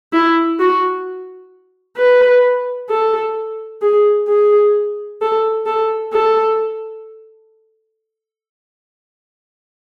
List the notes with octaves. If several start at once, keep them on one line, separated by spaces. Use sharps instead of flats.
E4
F#4
B4
A4
G#4
G#4
A4
A4
A4